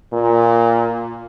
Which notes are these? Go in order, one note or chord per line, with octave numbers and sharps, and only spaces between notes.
A#2